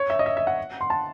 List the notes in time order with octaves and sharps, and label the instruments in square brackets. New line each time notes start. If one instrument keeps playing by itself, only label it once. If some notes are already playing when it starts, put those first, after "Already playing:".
Already playing: [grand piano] C#5
E5
D#5
E5
E5
F#5
C6
A5